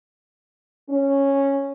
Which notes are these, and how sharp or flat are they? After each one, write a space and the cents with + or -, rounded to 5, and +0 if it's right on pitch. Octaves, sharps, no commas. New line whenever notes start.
C#4 -5